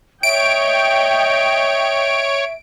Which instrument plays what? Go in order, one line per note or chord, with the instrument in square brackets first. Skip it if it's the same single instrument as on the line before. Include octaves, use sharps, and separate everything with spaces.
[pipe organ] C#5 [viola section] D#5 G5 [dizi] E5 [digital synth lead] D7